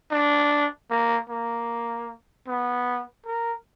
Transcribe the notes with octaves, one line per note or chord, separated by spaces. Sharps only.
D4
A#3
A#3
B3
A#4